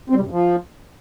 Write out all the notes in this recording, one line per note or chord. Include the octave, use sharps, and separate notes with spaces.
C4
G3
C3
F#2
F3